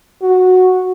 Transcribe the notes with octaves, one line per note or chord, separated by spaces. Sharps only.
F#4